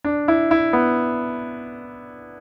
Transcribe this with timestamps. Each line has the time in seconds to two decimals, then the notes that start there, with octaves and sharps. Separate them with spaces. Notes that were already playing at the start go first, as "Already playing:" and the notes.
0.04 D4
0.28 E4
0.51 E4
0.73 B3